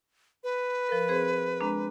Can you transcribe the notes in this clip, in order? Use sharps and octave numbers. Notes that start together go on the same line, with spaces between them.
B4
F3 A#4
C4 G#4 C5
G#3 D4 A#5